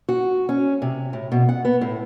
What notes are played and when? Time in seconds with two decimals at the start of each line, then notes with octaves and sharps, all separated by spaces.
0.09 F#4
0.49 C#4
0.82 C3
1.13 A2
1.32 B2
1.49 F#5
1.65 B3
1.81 A2